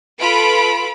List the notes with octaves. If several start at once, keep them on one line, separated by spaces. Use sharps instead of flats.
F4 A4 B4 B5 D7